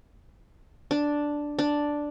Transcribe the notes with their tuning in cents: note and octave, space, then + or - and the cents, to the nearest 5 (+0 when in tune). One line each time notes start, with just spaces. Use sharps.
D4 +0
D4 +0